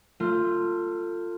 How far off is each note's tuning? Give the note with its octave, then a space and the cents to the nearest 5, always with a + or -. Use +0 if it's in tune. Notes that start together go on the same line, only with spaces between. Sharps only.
A3 +30 F4 +0